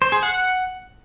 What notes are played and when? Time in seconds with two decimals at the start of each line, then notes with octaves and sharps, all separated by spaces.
0.02 C5
0.12 G#4
0.23 F#5